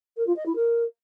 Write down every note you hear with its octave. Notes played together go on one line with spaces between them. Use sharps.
A#4
F4
D#5
E4
A#4